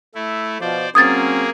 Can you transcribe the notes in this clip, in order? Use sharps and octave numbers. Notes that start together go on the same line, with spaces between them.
A3 E4
B2 F3 C5 D5
F#3 A#3 C4 C#4 G#4 D#6 G#6 A6